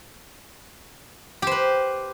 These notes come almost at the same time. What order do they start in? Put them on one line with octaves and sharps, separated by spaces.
G4 C5 B4